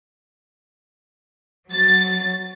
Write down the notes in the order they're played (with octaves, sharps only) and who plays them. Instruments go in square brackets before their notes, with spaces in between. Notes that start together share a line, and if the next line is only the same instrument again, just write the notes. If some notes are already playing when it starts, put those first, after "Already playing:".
[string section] F#3 A6